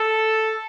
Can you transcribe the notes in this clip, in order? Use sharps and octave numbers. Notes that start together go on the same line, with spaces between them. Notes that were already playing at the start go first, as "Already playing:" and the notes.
Already playing: A4